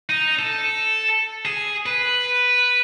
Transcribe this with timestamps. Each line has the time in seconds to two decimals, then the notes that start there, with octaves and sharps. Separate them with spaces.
0.09 D#4
0.39 A4
1.45 G#4
1.86 B4